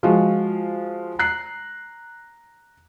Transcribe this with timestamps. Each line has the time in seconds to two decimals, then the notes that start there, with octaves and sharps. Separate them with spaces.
0.03 F3 G#3 F4 F#4
1.19 A#5 F#6 C7